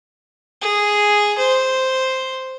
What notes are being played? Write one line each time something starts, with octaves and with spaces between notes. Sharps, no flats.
G#4
C5